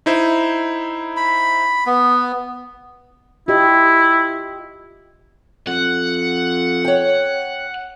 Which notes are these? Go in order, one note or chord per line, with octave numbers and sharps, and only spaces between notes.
D#4 E4 C5
B5
B3
E4 F4 G4 D#5
F2 F#5
C#5 G5